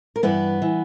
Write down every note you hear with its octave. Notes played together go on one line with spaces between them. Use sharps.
A#4
G2 E3 B3 B4
E3